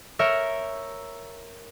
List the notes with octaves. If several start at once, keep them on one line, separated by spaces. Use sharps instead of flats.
A#4 C#5 E5 G6